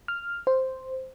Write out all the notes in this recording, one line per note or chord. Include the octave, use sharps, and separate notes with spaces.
F6
C5